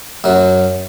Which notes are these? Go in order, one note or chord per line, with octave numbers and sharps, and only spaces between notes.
F#2 F#3